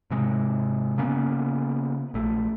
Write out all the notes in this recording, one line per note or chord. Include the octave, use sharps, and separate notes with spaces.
G#2 C3 G#3
C#3 A#3 B3 C#4
A#1 A3